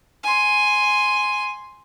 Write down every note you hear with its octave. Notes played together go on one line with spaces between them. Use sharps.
G#5 C6